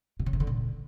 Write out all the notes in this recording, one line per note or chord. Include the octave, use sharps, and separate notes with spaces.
A#2
C#3
C3
D3
A#2